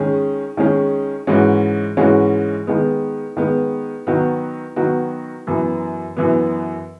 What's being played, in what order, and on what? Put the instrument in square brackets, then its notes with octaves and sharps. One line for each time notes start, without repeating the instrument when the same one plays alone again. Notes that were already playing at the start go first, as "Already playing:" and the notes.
Already playing: [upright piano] D#3 G#3 C#4 G#4
D#3 G#3 C#4 G#4
G#2 E3 G#3 C#4 F#4
G#2 E3 G#3 C#4 F#4
D#3 G#3 B3
D#3 G#3 B3
D#3 F#3 B3 F#4
D#3 F#3 B3 F#4
F#2 E3 B3
F#2 E3 B3